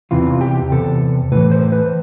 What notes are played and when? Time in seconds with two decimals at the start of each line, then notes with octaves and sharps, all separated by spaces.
0.11 E2 C3 E3 F4
0.41 G4
0.72 E2 C3 A4
1.32 A2 E3 B4
1.51 C5
1.72 B4